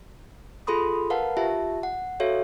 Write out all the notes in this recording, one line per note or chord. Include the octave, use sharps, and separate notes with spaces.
F4 G#4 A4 B5 C6 D#6
A#4 B4 F5 F#5 A5
F4 G4 E5 A5
F#5
F#4 A4 C#5 E5 F5